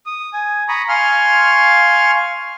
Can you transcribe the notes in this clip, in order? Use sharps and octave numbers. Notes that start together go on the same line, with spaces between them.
D#6
G#5
A#5 B5 C#6 D#6
F5 G#5 C6 C#6 F6